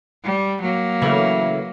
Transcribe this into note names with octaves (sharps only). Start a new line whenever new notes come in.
G3
F#3 A#3
C#3 E3 A3